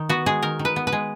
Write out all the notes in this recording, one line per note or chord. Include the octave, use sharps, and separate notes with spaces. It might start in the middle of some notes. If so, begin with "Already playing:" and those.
Already playing: D#3
B3 F#4
G#3 G#4
D#3 A#4
D#3
B4
B3
B4
G#3